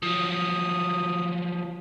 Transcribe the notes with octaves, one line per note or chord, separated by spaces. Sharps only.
F3 F#3 D#6